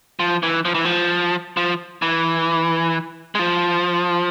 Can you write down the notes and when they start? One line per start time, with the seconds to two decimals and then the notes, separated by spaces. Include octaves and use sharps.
0.19 F3
0.43 E3
0.65 F3
0.75 E3
0.85 F3
1.57 F3
2.02 E3
3.35 G#3
3.39 F3